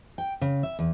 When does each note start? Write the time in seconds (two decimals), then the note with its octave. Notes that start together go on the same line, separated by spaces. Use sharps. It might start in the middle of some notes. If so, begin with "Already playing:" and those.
0.18 G5
0.41 C#3
0.63 E5
0.79 E2